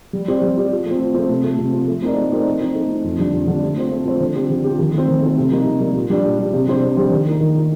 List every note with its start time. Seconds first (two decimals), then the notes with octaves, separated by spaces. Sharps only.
0.13 G3
0.28 C4 G4 D5
0.42 G3
0.57 C4 G4 D5
0.71 F3
0.86 A3
0.91 C4
1.00 F3
1.14 A3 C4
1.29 C3
1.44 F3 A3
1.58 C3
1.73 F3 A3
1.88 A3
2.02 C4 D#4 A#4 D5
2.16 A3
2.32 C4 D#4 A#4 D5
2.46 A3
2.61 C4 D#4
2.75 A3
2.90 C4 D#4
3.04 F2
3.19 D3 G3 D4
3.33 F2
3.47 D3 G3 D4
3.62 A3
3.77 C4 F4 C5
3.91 A3
4.05 C4 F4 C5
4.20 D3
4.36 F3 C4 G4
4.50 D3
4.64 F3 C4 G4
4.79 D#3
4.94 A3 C4
5.08 D#3
5.22 A3 C4
5.38 C3
5.51 G3 A#3 D#4
5.66 C3
5.80 G3 A#3 D#4
5.95 A#2
6.10 G3 D4 G4 D5
6.25 A#2
6.38 G3 D4 G4 D5
6.53 C3
6.67 G3 D4 G4 C5
6.82 C3
6.97 G3 D4 G4 C5
7.11 D#3
7.27 A#3 D#4
7.41 D#3
7.56 A#3 D#4